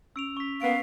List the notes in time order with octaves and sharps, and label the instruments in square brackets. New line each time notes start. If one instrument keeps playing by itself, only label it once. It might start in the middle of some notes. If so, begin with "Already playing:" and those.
[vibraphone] C#4 [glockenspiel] E6 D7 F7
[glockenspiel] C#6 B6
[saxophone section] A#3 B3 [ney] F5 [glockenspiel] B6 D7